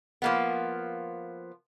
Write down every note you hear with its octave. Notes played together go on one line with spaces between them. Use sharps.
F3 A#3 B3